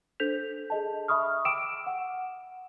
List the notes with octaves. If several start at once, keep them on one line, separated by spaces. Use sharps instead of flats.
D4 A4 C5 G6 B6 F7
G#4 D#5 A5
E5 B5 C#6 D#6 F6
G5 D6 E6 D7 E7
F#5